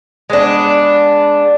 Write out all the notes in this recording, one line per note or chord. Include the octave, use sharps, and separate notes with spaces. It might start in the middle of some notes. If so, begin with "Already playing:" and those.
G#3 B3 D4